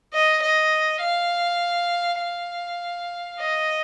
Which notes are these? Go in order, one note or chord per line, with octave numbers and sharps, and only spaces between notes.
D#5
D#5
F5
F5
D#5